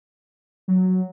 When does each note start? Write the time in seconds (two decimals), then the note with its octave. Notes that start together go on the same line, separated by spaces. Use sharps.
0.68 F#3